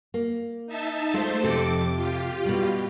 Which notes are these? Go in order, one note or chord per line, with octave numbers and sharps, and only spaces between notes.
A#3
D#4 E5 A5
G#3 A3 F4 C5
F2 C3 A4 D6
F4 G4
B2 G3